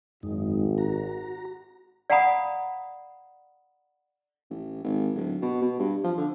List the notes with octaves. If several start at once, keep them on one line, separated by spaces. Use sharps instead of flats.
G#1 F#2 G#3 D#4
F#4 A#5
D5 F5 F#5 A#5 B5 D#6
A1
G#1
D1
B2
B2
G2
F3
D3